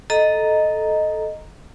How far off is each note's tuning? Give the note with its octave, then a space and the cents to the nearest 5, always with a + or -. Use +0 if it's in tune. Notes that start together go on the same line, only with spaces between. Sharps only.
A4 -10 D#5 +0 A#5 +0